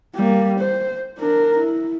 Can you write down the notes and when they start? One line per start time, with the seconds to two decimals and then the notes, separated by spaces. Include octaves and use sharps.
0.15 G3 A#3
0.59 C5
1.19 D4 A#4
1.58 E4